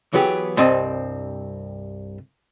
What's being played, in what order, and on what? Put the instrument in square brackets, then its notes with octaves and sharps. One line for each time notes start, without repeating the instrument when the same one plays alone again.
[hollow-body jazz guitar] E3 F#3 B3 G4 G#4
C2 G2 G3 C4 D#5 A5